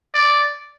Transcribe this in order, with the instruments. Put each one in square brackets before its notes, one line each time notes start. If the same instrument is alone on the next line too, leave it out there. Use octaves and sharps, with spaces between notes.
[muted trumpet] D5